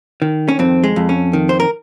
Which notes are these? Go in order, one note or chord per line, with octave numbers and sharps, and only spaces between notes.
D#3
C#4
F2 C4
G#3
F2
C#4
D#3
C5
A#4